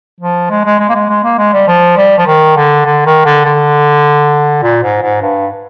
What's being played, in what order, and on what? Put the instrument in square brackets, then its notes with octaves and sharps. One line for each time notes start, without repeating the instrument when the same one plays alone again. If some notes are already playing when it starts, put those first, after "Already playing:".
[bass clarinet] F3
G#3
G#3
G#3
A#3
G#3
G#3
A#3
G#3
G3
F3
G3
F3
D#3
D3
D3
D#3
D3
D3
A#2
G#2
G#2
G2